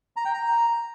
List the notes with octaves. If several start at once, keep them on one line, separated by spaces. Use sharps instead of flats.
A#5
G5
A#5